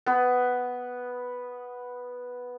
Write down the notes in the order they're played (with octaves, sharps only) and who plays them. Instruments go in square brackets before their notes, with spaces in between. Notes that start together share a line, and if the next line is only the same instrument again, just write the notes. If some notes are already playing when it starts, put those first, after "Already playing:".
[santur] B3 B4